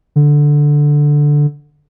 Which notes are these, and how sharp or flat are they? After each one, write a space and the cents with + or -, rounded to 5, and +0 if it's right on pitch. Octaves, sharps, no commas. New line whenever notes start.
D3 +0